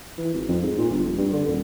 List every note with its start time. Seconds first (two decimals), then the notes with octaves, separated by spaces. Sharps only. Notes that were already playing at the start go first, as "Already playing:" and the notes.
0.18 E3
0.34 G#1
0.48 F2
0.63 G#2
0.78 A#2
0.91 G1
1.06 F1
1.18 G2
1.33 D3
1.47 D#1